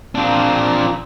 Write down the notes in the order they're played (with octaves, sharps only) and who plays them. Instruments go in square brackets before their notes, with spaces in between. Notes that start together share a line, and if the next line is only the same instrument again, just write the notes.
[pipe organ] A#2 F3 C4 [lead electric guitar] D4 F4